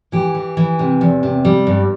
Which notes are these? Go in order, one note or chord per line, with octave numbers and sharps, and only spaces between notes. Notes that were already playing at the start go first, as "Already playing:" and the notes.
E3 G4
E3
E3
C3
E2
C3
G3
G2